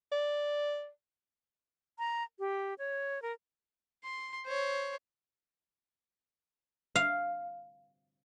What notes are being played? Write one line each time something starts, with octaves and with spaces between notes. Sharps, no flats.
D5
A#5
G4
C#5
A#4
C6
C5 C#5
F5